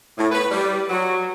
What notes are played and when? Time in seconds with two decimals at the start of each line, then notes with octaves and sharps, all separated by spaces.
0.17 A2
0.30 B4
0.51 G3
0.89 F#3